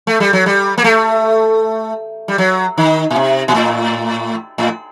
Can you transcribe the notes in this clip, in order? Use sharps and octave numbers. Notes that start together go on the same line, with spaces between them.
A3
G3
F#3
G3
A#3
A3
G3
F#3
D#3
A#2
C3
A#2
A2
A2